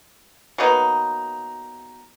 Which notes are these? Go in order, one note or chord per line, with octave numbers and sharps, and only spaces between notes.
F#3 A#3 B3 D#4